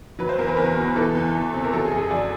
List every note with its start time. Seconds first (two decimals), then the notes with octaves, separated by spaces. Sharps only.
0.19 F#3 B4
0.29 C5
0.38 E2 A#4
0.48 B4
0.57 E2 A#4
0.77 B2
0.95 E3 A4
1.15 E2
1.35 E2
1.54 C3
1.64 A#4
1.73 F#3 A4
1.85 G#4
1.92 F#2
1.99 G#4
2.11 F#2 D5